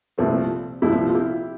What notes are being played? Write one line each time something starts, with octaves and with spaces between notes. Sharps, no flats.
C2 A#2 F3 A3 C4
C2 A#2 F3 E4 G4
F4
E4 G4